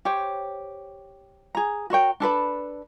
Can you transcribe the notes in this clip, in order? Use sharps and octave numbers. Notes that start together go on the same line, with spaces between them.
G4 C5 C#5 G5
G#4 A#5
F#4 A#4 C#5 G5
D4 A4 B4 B5